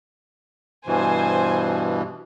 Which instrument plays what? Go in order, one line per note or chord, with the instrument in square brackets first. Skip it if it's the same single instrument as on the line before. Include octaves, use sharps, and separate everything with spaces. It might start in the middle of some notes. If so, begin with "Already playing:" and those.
[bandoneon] G2 B2 E3 [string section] C5 G#5